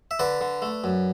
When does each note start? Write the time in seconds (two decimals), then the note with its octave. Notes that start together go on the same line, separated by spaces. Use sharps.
0.11 E5
0.19 D3 B4 D5
0.41 D3
0.62 A3
0.84 F#2